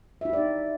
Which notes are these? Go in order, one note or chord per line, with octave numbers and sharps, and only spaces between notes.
D#4 E4 G4 D5 E5